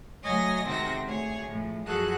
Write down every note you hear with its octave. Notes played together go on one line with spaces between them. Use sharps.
D2 F#3 C#5 D#5 G#5 A#6
C3 D#3 G#3 C4 F#4 A#6
D2 G#4 C#5
A2 F3 G#3
F#2 F3 F#4 G#4 A4 F#6